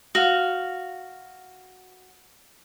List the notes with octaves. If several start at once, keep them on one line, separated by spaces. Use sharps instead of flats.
F#4 F5